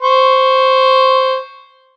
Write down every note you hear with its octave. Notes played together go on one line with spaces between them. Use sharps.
C5 C#6